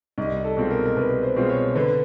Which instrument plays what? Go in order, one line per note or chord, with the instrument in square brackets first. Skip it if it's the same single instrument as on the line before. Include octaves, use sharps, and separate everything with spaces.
[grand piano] C2 [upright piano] D#4
[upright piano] A4
[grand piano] B2 G#3 C4 F4
[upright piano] A#4
A#4
[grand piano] C2 [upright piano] B4
[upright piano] C5
[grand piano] B2 G#3 C4 F4
[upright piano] C#5
[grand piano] D3 [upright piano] B4